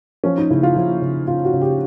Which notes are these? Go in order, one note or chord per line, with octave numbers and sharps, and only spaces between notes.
F3 C#4
D#4
C#3 E4
F4
F3 E4
C#3
C#3 F4
F#4
C#3
G4